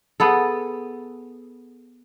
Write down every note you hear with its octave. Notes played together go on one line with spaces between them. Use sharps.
B3 G#4 A4